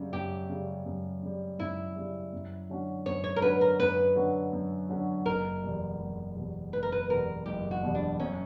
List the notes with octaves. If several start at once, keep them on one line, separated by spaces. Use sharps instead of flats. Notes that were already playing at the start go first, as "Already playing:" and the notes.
Already playing: F#2 C#3 G3
F#2 G4
C#3 G3
F#2
C#3 G3
F#2 E4
C#3 G3
F#2
D3 F#3 C#4 F#4
F#2 C#5
C#5
A#4
D3 F#3 C#4 F#4 B4
A#4
F#2 B4
D3 F#3 C#4 F#4
F#2
D3 F#3 C#4 F#4
F#1 A#4
E2 B2 G3
F#1
E2 B2 G3
F#1 B4
A#4
B4
E2 B2 G3 A#4
F#1 G4
F#4
E2 B2 G3
D4
F#2 C#4